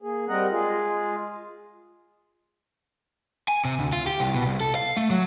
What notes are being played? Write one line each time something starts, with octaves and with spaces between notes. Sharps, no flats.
A#3 G#4
G3 C4 A#4 D#5 F#5
G#3 F4 G#4
G#5
C3
D2
F4
G4
C2
B2
C2
A4
F5
A3
F#3